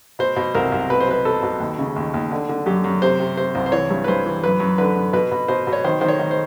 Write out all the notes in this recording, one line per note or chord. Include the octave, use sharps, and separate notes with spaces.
B2 C5
B2
C2 A#4
C2
B2 B4
C5
B2 B4
B2 A4
B2
D#2
C#3
D#2
D#2
D3
D3
F#2 G4
F#2
C3 C5
C3
C3 C5
C2
C5
E3 C#5
G2
B4
G2 C5
E3
F#2 B4
F#2
D3 B4
F#2
B2 B4
B2
B2 C5
B2
C#5
D#3 C5
D#3 C5
C#5
D#3
C5